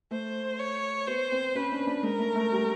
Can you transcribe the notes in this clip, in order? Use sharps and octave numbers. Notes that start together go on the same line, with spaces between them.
A3 C5
C#5
B3 C5
C4
C#4 B4
D4
D4
G#3 A#4
A3
A3
G3